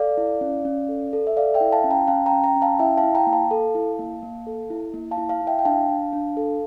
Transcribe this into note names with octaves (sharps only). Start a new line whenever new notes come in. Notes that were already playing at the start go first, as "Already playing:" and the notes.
Already playing: A4 D5 F5
E4
C#4
C#4
A4
A4
E5
A4 D5 F5
E5 G5
E4
F5 A5
C#4
G5 A#5
C#4 F5 A5
G5 A#5
C#4
G5 A#5
C#4
F5 A5
E4 E5 G5
F5 A5
E4
G5 A#5
A#3
F5 A5
A4
E4
A#3
A#3
A4
E4
A#3
F5 A5
E4
F5 A5
E4
E5 G5
G5
D4 F5 A5
D4
D4
A4